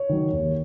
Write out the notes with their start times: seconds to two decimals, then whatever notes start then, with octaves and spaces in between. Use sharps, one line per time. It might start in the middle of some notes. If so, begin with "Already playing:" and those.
Already playing: C#5
0.09 D#3 F#3
0.33 D#2